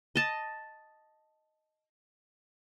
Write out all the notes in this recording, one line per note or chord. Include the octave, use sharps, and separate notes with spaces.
D#5 A5